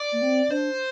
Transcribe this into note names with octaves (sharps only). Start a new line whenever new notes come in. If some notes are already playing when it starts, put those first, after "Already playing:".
Already playing: D5
A#3
C4
D4 C5